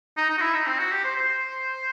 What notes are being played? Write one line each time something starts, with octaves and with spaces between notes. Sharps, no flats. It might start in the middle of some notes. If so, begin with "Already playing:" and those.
D#4
D#4
F#4
E4
D#4
C4
F#4
G4
C5
C5